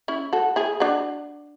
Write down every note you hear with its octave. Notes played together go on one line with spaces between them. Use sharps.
C#4 E4
F#4 A4
E4 G#4
D4 F#4